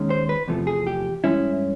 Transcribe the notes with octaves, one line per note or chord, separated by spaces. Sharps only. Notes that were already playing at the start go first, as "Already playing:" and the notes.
Already playing: D#2 D#3 G#3 C#4
C5
B4
E2 C3 F3 A3
G#4
G4
G2 E3 G#3 C#4 E4